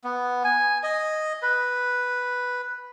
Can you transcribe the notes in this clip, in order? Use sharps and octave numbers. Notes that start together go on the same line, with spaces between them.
B3
G#5
D#5
B4